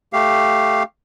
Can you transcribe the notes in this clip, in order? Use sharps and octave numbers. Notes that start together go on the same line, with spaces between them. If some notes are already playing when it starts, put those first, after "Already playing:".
A3 G4 F5